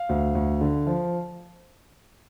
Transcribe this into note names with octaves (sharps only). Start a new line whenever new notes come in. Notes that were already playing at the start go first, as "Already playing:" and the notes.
Already playing: F5
D2
D2
D3
F3